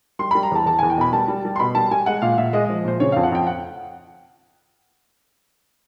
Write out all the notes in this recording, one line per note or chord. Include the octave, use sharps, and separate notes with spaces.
G3 C6
G3 B5
A#5
E2 A5
E2 A5
E2 G#5
G5
B2 B5
G3 A5
G3
G3
C6
B2 B5
G3 A5
G3 G#5
G#3 F#5
A#2 F5
A#2 E5
G#3 D#5
F3 D#5
A#2 C5
C#3 C#5
F2 F5
F#5
F2 G5
F#5